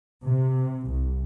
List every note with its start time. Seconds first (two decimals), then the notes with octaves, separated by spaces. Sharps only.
0.24 C3
0.87 C2